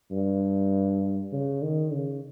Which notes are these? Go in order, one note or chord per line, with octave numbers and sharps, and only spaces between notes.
G2
C#3
D#3
C#3